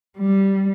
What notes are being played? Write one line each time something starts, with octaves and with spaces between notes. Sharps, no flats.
G3